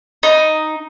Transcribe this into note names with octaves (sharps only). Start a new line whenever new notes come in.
D#4